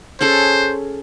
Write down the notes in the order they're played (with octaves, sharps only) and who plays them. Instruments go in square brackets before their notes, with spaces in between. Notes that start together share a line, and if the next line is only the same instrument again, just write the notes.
[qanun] C#4 G#4 A4 [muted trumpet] C5